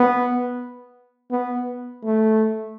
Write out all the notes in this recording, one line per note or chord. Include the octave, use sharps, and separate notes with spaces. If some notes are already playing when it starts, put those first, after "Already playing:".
Already playing: B3
B3
A3